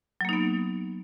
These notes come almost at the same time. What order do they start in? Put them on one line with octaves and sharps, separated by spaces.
F#3 A#3 D#4 B3